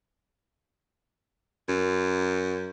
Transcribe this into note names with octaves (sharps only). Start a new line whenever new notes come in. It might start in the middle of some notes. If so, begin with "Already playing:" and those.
F#2